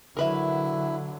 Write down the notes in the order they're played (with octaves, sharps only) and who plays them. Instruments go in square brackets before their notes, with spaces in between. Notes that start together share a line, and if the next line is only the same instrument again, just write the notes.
[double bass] D3 F#3 [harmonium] E4 [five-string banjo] A#4 B4 E5